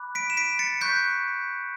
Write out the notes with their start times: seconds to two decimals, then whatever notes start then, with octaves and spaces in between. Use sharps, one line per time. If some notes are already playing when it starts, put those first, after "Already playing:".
Already playing: B5 D6 F#6
0.15 B6 D7
0.30 E7
0.37 B6 D7
0.59 A6 C#7
0.81 C#6 F#6 G6 B6